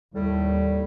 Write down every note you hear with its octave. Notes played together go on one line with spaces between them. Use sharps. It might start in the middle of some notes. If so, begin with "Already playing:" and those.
D#2 A2 G3